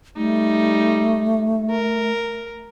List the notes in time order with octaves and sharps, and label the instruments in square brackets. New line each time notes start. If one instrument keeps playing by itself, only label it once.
[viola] G3 D#4 [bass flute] A3
[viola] A#4